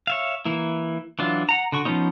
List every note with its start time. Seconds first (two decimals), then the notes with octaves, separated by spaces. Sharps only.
0.07 C#5 E5 F5
0.45 E3 A#3 E4
1.19 E3 F#3 D4 F4
1.49 F#5 A#5
1.72 D3 F#4 C#6
1.85 F3 A3 B3 C#4 D#4